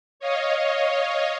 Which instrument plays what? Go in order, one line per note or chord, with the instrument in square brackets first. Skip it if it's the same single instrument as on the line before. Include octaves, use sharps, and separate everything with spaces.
[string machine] C#5 D#5 F5